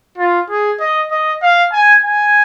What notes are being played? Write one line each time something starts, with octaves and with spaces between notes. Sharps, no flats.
F4
G#4
D#5
D#5
F5
G#5
G#5